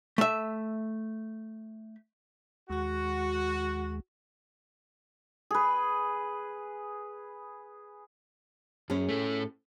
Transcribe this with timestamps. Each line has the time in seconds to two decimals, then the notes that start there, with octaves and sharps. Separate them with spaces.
0.18 A3 E5
2.70 D#2 G#3 F#4
5.51 G#4 B4
8.90 F#2 C#4 G#4
9.09 A2 A3